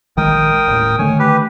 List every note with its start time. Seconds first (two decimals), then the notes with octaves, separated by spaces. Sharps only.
0.17 A#1 D#3 G#3 A#4 G5 D#6
0.67 D#1 A2
0.99 D3 D#3 A3 C#5 G#5
1.19 G4 B4